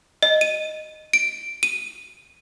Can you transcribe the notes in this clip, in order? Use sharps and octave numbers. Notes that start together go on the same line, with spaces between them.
D#5
D#7
D7
D#7